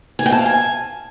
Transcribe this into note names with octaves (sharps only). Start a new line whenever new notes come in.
G#5
G5
A5
F5
G#5